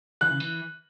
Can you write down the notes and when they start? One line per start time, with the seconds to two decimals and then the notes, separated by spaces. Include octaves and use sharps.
0.21 E3 F#6
0.31 C#3
0.40 E3